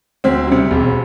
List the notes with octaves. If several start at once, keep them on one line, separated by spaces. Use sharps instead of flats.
D2 C4
C3 G3
E1